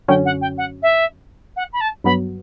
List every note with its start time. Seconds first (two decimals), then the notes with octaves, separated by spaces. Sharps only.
0.08 F#2 D3 F#3 C#4 G5
0.25 F#5
0.41 G5
0.58 F#5
0.82 E5
1.56 F#5
1.73 B5
1.80 A5
2.04 G2 F#3 B3 B5